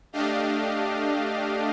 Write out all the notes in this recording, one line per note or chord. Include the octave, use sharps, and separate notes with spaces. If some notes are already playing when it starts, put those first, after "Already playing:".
A3 D4 G4 D#5 F5